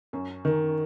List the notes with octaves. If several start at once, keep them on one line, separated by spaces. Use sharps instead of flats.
F#2 C#4
D#3